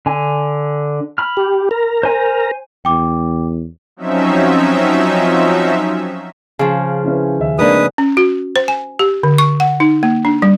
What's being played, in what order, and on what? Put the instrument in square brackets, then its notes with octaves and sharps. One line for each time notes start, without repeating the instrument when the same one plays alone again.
[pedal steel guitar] D3 G#5
B5 F6
[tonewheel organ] G4
A#4 A#5
[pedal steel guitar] C5 G#5
[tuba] E2 [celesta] G5 D6
[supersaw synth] F3 F#3 C4 C#4 D#4 E5
[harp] C#3 F3
[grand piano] C#4 E4 B4
D#2 E5
[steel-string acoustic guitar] G#3 A#3 D4 [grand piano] C4 D#4 [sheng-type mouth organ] B4 D#6
[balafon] C#4
F#4
C5
G#5
G4
D3
C#6
F#5
D#4
A#3
D4
G3